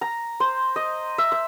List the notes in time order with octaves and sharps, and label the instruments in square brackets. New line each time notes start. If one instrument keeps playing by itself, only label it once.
[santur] A#5
C5
D#5
E5
E5